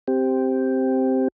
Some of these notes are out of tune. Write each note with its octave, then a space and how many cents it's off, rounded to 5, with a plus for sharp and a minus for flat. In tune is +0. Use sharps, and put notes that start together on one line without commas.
C4 +0 G4 +0